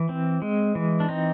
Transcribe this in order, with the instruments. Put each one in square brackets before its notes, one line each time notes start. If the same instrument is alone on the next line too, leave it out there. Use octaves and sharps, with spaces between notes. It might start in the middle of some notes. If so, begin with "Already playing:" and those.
Already playing: [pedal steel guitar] E3
C4
G#3
E3
D4
C4 D#4